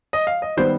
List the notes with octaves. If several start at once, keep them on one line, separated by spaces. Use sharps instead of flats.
D#5
F5
D#5
D#3 G3 B3 C5